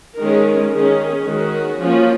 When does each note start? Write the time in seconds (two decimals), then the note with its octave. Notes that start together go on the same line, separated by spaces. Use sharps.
0.17 D#3 G#3 C#4 A#4
0.72 D#3 G#3 C#4 G#4
1.25 D#3 G#3 C#4 F#4
1.79 F3 A#3 C#4